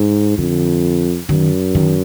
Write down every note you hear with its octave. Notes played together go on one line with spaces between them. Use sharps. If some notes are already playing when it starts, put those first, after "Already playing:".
Already playing: G#2
F2 D3
F#2 D#3
D#3